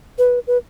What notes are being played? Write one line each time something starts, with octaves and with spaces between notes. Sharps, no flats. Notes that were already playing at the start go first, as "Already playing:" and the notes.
B4
B4